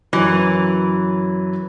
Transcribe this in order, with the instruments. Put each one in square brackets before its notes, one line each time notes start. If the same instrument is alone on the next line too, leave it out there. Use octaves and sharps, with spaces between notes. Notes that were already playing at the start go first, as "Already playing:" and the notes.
[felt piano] F#2 F#3 [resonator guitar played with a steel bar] E3